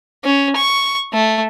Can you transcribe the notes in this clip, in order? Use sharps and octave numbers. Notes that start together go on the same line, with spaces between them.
C#4
C#6
A3